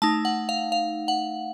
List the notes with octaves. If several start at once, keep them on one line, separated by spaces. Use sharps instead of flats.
A3 D#4 A5
F#5
F5
F5
F#5